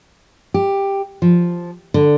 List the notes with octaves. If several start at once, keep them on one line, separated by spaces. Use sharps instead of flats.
G4
F3
D3